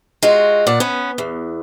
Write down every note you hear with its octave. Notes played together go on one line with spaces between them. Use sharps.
G#3 F4 F#4
A#2 D5 F#5
B3 C#4
E2